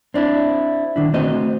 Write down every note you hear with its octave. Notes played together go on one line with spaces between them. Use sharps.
C4 D4 E4
D#3 D4 E4
A3 C4 F#4 C5 D#5